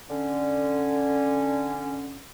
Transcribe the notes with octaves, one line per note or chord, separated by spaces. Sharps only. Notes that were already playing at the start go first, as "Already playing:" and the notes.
D3 C#4